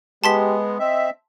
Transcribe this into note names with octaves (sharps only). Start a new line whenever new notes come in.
G#3 B3 G4 A5 C6 B6
C4 D#5 E5